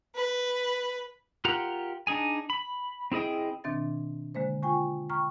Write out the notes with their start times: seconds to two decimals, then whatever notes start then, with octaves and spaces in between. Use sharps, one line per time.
0.16 B4
1.45 F4 G4 A#4 F#5 A#5
2.07 D4 D#4 G#4 G#5
2.50 B5
3.12 C4 E4 G#4 D#5 G5
3.64 B2 D#3 C4 D4 E5 A6
4.35 D3 G#3 A#3 C5
4.63 F4 G5 G#5 C#6
5.10 G5 A#5 C#6 F6